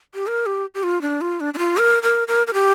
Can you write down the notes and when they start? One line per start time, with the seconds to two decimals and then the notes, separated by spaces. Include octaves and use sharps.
0.14 G4
0.27 A#4
0.46 G4
0.75 G4
0.83 F4
1.02 D4
1.21 F4
1.40 D4
1.54 D4
1.58 F4
1.78 A#4
2.03 A#4
2.28 A#4
2.47 A#4
2.54 G4